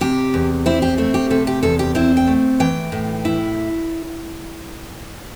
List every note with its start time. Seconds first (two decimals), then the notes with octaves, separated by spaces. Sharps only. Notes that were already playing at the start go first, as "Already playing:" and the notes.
0.01 C3 G4
0.34 E2
0.66 C4 E4
0.82 G4
0.98 A3 E4
1.14 G4
1.30 C3 A4
1.47 G4
1.63 E2 A4
1.79 G4
1.95 C4 E4
2.17 G5
2.27 A3
2.60 E3 G5
2.92 A2
3.25 E4